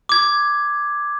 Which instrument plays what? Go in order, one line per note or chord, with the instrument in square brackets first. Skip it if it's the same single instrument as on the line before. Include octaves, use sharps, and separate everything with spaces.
[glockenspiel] D6 G#6